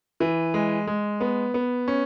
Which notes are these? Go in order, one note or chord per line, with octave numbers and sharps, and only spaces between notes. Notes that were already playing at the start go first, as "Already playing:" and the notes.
E3
G#3
G#3
B3
B3
C#4